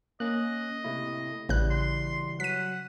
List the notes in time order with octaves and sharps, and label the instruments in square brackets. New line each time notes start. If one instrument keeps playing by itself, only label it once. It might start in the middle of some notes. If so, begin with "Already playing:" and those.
[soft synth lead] A#3 [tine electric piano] C#4 F#6 [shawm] D#5
[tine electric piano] C3 A3 E4
[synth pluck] A1 F#6 [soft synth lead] C#3 [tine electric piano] E3 G3
[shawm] C6
[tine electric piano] F#3 [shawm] F#5 [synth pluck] B6 D#7